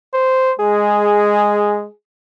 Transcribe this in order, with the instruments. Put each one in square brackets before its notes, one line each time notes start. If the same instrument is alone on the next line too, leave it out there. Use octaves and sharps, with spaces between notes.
[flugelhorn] C5
[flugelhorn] G#3 [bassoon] G#4